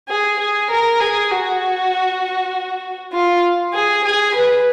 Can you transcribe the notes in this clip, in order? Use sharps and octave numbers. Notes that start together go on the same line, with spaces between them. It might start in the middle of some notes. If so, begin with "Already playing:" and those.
G#4
G#4
A#4
G#4
F#4
F4
G#4
G#4
B4